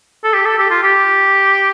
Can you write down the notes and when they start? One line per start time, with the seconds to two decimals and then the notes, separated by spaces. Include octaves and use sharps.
0.24 A4
0.34 G4
0.46 A4
0.58 G4
0.70 F4
0.83 G4